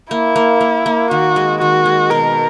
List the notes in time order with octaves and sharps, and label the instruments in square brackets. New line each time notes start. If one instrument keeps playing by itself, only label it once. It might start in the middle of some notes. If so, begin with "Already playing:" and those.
[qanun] A#3 [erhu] E4
[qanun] A#3
A#3
A#3
[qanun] D#3 [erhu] F#4
[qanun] G#3
[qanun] D#3 [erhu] F#4
[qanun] G#3
[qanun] B2 [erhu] A#4